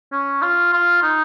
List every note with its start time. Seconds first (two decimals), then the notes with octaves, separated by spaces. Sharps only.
0.12 C#4
0.42 F4
0.73 F4
1.03 D#4